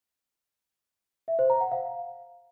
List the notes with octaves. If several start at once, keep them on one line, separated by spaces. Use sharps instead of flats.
E5
C5
A#5
F#5
F5